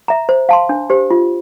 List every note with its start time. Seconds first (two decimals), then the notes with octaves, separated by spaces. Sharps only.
0.08 E5 A#5
0.29 C5
0.49 F5 A5 C6
0.69 D4
0.90 G4 C5
1.11 F4